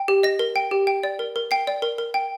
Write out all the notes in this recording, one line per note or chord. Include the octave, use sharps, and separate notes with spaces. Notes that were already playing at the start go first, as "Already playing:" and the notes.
Already playing: G5
G4
D#5 A#6
A#4
G5
G4
G5
D5
A#4
A#4
G5 C7
D5
A#4
A#4
G5